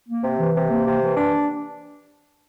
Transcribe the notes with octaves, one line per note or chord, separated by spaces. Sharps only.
A#3
C3
E3
C3
A#3
C3
E3
D4